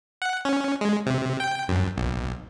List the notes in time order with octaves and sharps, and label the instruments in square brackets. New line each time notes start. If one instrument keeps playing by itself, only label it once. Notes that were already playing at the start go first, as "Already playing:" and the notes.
[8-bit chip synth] F#5
C#4
G#3
C3
G5
F#2
B1